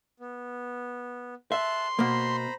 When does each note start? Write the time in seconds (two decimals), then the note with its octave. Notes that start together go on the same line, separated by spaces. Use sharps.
0.20 B3
1.52 E5 A5 C6 F#6
1.99 B2 A#3 C5 A#5 B5